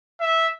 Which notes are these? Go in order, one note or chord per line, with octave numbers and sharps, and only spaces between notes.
E5